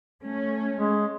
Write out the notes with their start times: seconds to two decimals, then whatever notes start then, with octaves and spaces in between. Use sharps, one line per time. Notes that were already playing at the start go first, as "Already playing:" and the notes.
0.23 A3 C#4
0.74 G#3